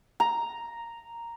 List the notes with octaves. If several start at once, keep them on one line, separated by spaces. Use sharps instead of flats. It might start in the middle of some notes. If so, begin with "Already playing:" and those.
A#5